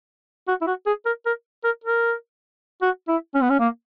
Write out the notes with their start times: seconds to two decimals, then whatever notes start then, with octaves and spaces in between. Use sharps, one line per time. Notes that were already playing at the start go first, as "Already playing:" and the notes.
0.48 F#4
0.62 E4
0.67 F#4
0.86 G#4
1.06 A#4
1.26 A#4
1.64 A#4
1.84 A#4
2.82 F#4
3.08 E4
3.35 C#4
3.42 B3
3.50 C#4
3.60 A#3